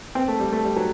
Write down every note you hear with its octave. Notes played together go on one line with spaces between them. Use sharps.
C4
A3
G3
A3
G3
F#3